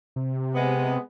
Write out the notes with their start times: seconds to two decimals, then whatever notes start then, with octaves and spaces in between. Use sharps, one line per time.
0.16 C3
0.55 G#3 B3